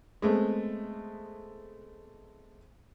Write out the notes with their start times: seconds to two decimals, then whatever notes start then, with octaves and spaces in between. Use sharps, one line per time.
0.22 G#3 A3 B3 C4